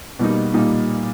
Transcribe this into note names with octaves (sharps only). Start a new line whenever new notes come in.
B2 G3 A#3 D#4
A#2 G3 A#3 D#4